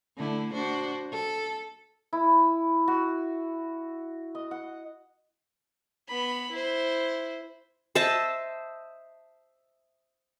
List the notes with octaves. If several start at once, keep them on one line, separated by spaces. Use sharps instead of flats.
D3 A3 E4
D4 F#4 C5
A4
E4
F#4
D#5
F#5
B3 B5
E4 C5
C5 D#5 E5 A5